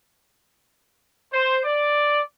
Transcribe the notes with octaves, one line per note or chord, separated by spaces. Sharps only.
C5
D5